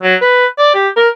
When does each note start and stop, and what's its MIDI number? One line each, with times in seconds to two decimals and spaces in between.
0.03 0.15 54
0.22 0.46 71
0.58 0.70 74
0.75 0.88 67
0.97 1.09 70